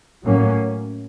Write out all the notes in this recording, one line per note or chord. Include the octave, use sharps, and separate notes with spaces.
A2 F#3 A#3 C#4